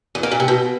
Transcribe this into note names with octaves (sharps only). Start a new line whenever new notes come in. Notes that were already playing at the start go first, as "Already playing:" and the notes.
E2
A#3
A#2
C3
B2